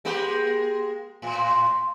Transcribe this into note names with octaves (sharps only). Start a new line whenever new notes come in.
G#3 A#3 G4
A2